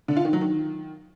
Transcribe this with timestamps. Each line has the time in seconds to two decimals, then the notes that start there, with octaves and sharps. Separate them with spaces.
0.08 D3
0.17 F4
0.25 D#3
0.33 F#3
0.41 D#3